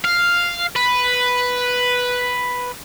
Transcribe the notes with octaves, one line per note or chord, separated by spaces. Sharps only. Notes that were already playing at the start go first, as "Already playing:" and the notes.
F5
B4